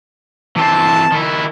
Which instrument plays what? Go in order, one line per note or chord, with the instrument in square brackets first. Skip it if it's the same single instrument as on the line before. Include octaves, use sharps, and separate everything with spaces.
[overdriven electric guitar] E3 C4 [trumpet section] A5
[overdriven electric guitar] D#3 E4